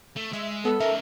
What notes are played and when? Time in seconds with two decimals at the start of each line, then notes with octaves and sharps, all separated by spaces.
0.17 A3
0.33 G#3 E5
0.65 B3 A4
0.80 C#4 D#4 A#4 E5